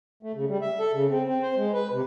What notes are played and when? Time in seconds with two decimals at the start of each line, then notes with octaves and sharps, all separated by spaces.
0.23 A3
0.35 C#3
0.48 G3
0.62 E5
0.80 A4
0.93 C#3
1.10 C4
1.25 C4
1.42 C5
1.56 G#3
1.74 B4
1.92 C3